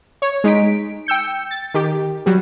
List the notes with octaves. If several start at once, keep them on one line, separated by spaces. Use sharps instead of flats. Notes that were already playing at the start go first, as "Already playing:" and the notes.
C#5
G#3 D#4 B6 D7
G5 E6 G6 C#7
A6
D#3 G4
F#3 G3